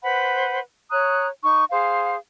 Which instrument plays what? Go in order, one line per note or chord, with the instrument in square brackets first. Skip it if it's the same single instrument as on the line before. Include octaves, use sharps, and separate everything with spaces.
[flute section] B4 C5 F#5 B5
C#5 A#5 D#6 F#6
D#4 C#6
G#4 C5 F5